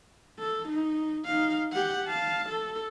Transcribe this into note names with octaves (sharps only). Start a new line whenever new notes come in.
A4
D#4
D#4 F5
G4 F#5
F5 A5
A4